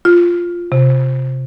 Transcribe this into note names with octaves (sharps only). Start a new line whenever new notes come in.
F4
C3